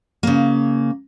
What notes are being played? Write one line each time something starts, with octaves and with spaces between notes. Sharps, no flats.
C#3 A#3